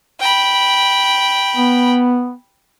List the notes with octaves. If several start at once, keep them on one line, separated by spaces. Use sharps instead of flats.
G5 B5
B3